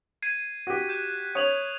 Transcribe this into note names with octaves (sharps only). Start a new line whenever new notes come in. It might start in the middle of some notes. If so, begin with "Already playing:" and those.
G#6 C7 D#7
F#4 G4
F#6 G6 E7
C#5 D#6 F7 F#7